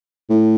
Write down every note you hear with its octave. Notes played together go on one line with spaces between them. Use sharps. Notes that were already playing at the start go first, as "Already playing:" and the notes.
A2